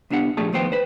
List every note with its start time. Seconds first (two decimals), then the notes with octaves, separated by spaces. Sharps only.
0.10 C2 B3 D4 G4 F#5
0.37 A#2 F3 A3 G4 G#4 A5
0.52 D#3 F3 A3 B3 C5 G5
0.72 B4 C5